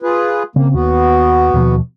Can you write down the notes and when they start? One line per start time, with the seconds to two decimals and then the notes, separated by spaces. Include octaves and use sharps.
0.02 F4 G#4 B4
0.56 C#3 A#3 C4
0.74 D#2 B3 F#4
1.53 D#2 B2 F3